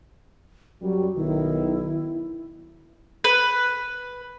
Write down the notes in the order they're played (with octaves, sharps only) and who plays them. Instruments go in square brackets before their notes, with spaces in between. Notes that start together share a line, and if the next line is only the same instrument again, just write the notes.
[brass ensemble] F#2 F#3 G3 [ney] F#4
[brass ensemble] B1 D#3 [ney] E4
[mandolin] B4